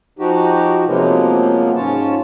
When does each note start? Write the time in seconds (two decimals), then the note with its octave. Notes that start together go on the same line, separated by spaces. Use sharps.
0.19 F3 D#4 F#4 G4
0.86 C3 F3 F#3 G#3 A#3 B3
1.76 G#2 C#4 F4 C#5 A5